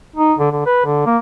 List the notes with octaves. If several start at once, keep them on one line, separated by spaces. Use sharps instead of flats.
D#4
D3
D3
B4
D3
A#3